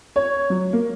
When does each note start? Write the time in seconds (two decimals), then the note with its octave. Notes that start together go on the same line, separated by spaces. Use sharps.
0.16 C#5
0.50 F#3
0.73 A#3